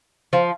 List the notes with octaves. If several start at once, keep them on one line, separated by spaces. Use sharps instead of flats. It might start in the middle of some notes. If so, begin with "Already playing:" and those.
F3